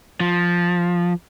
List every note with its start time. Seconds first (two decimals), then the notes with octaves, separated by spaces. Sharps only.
0.20 F3